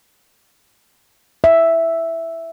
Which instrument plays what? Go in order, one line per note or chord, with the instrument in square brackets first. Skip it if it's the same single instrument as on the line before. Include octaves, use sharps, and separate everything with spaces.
[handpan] E5